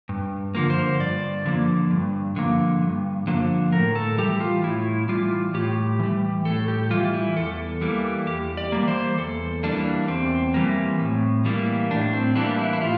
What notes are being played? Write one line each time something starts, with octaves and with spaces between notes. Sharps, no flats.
G2
D3 F3 A#3
C5
G2 D5
D3 F3 A#3
G2
D3 F3 A#3
G2
D3 F3 A#3
A2 A#4
A4
E3 G3 G4
F4
A2 E4
E3 G3 F4
A2 G4
E3 G3
A2 A4
G4
E3 G3 F4
E4
E2 A4
E3 G3 A#3
E2 G4
D5
E3 G3 A#3
C5
E2 A4
E3 G3 A#3 D4
E2 C4
E3 G3 A#3
A2
E3 G3 A#3
A2 D4
C4
E3 G3 A#3 D4
E4
E4
A2 F4